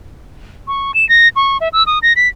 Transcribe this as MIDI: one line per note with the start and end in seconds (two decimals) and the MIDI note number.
0.68 0.92 85
0.94 1.08 100
1.09 1.28 94
1.36 1.57 85
1.61 1.68 76
1.73 1.83 88
1.87 1.99 87
2.03 2.13 94
2.16 2.28 95